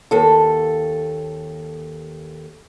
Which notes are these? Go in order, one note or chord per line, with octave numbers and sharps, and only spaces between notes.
D#2 A4